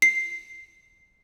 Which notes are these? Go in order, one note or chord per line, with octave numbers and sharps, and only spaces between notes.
C7